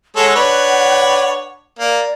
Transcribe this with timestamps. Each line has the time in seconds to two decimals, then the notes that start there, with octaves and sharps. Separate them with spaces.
0.16 G#3 A4 C#5 F#5
0.36 D4 B4 C#5
1.78 A#3 D5